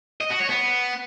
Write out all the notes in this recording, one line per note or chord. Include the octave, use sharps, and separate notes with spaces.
D#5
F#4
C#5
B3